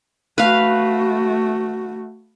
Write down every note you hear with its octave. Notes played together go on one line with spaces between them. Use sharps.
A3 F#4 B4 F5